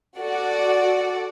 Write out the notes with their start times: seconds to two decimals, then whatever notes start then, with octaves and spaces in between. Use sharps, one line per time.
0.18 F#4 A4 D5 F#5